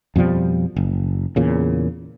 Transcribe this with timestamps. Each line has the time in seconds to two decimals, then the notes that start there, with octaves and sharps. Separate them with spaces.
0.16 F2 B2 F3 G3
0.76 F#1
1.36 E2 A#2 C#3